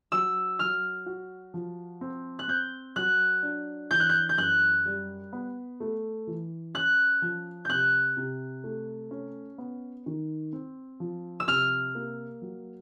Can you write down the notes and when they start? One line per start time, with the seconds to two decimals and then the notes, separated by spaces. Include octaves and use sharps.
0.12 F#3 E6
0.59 F#3 F6
1.06 F#4
1.54 F3
2.01 C4
2.39 F#6
2.48 C4 G6
2.96 F#3 F#6
3.43 D4
3.91 E3 G6
4.00 F#6
4.09 G6
4.29 G6
4.38 F#2 F#6
4.86 G3
5.33 B3
5.80 A3
6.27 E3
6.74 C#4 F#6
7.22 F3
7.65 C3 F#6 G6
8.17 C3
8.64 A3
9.11 C#4
9.58 B3
10.06 D#3
10.53 C4
11.00 F3
11.40 E6
11.48 C3 F6
11.95 A#3
12.42 F#3